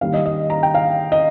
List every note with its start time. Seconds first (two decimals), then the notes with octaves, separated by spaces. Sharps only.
0.01 D#3 G3 A#3 D#4 F5
0.14 D#5
0.26 D#5
0.50 A#5
0.63 G5
0.74 F5
1.12 D#5